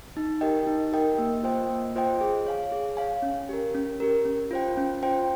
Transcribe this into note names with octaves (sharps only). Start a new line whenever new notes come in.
D#4
G4 A#4 D#5 G5
D#4
G4 A#4 D#5 G5
A#3
F4 C5 D#5 G5
A#3
F4 C5 D#5 G5
G#4
C#5 F5 G#5
G#4
C#5 F5 G#5
C#4
G4 A#4
C#4
G4 A#4
C#4
F4 C5 G5
C#4
F4 C5 G5